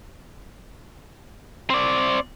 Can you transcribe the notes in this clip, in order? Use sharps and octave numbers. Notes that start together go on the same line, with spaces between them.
C4 D5